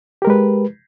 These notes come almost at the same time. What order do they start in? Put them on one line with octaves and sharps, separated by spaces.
G4 A#4 G#3 B4